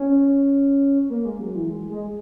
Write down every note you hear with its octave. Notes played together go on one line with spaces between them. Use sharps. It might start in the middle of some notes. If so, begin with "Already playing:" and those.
Already playing: C#4
A#3
G#3
F#3
E3
G#3
G#3